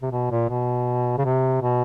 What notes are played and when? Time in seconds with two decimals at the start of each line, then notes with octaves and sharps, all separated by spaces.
0.02 C3
0.12 B2
0.31 A#2
0.49 B2
1.18 C#3
1.25 C3
1.62 B2